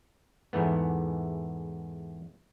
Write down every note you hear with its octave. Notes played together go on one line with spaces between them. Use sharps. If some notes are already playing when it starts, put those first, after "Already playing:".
E2 G#2 E3 A3 B3